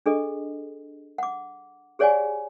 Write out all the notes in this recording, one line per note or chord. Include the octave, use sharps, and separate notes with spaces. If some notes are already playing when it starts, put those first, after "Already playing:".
D4 G#4 A4 D#5
F#5 D6
G4 G#4 C#5 D5 F#5 G#5